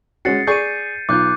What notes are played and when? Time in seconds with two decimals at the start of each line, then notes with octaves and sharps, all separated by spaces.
0.25 G#3 C#4 F#4 A6 C7 C#7
0.47 G#4 D5 C#6 G6 D#7
1.09 B1 F4 D6 F#6 G6